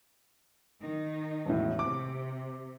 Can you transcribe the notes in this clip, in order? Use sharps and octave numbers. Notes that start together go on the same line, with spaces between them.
D#3 D#4
E1 A2
C3 D6